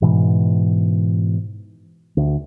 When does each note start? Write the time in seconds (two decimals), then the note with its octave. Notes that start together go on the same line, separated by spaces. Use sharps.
0.02 G#2 B2 E3
2.17 D2